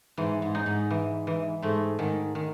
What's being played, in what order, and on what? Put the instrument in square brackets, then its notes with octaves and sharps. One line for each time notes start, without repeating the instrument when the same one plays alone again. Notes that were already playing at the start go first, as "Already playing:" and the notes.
[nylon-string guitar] G#2 [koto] E3
[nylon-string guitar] G#2
[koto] D#4
[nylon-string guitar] G#2
[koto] E3
E3
[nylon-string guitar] G#2 [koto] A3
[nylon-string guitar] G#2 [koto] D#3
[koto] D#3